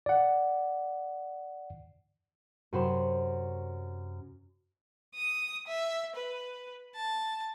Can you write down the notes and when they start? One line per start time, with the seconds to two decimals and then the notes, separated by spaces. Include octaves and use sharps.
0.06 D5 F#5
2.73 F#2 C3 F#4 C5 B5 E7
5.15 D#6
5.67 E5
6.15 B4
6.95 A5